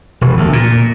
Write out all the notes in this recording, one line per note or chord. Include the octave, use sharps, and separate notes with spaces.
E1
D2
A#2